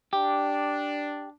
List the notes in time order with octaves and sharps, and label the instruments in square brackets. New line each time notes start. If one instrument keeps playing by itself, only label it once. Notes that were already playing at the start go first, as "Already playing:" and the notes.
[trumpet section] D4 [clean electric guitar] G4